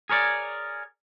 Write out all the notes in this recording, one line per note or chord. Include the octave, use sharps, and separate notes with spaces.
G#4 A#4 C#5 D5